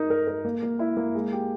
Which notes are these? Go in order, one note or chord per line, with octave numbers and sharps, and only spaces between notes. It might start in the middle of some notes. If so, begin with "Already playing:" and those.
Already playing: D#4 A#4
A#4
A#4
A#3
A#3
E4
A#3
G#3
G4